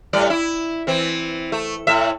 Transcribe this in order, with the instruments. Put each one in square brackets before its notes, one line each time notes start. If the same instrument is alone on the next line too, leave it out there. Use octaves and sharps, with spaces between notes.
[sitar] A2 G3 D5
E4
E3 C4
A3
A2 E5